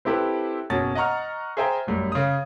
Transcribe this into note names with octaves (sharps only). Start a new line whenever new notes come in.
C4 E4 G4 A4 B4
F#1 B2 F#3 C#4 A6
D#5 F#5 A#5 C#6 F6
G#4 C5 E5 G5 A#5
A1 F#2 G3
C#3 D#6